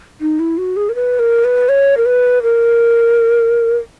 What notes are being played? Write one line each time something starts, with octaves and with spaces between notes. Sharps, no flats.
D#4
E4
F#4
G#4
A#4
B4
A#4
B4
C#5
A#4
B4
A#4